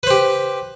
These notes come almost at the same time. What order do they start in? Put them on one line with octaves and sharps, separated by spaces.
B4 C5 G4